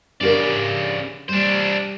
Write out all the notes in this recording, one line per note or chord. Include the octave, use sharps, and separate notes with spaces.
C#3 D4 G4 A#4 D5
G3 D4 C5